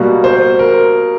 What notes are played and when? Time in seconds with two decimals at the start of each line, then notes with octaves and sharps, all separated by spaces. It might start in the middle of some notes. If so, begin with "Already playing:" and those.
Already playing: B2 G3 A#3
0.24 C5
0.59 A#4